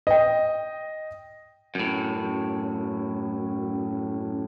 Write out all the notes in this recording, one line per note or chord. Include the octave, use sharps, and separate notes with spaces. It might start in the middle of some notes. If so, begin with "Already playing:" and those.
D#5 G5
F#2 A2